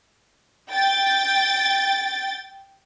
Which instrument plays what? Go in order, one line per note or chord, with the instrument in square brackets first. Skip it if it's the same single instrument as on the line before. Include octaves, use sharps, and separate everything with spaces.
[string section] G5 A6